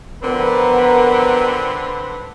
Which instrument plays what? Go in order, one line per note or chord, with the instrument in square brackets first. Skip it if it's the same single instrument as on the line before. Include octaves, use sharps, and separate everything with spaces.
[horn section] D3 C4 B4 [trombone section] F3 B3 A#4